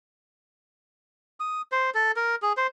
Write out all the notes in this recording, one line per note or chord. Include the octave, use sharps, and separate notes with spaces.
D#6
C5
A4
A#4
G#4
C5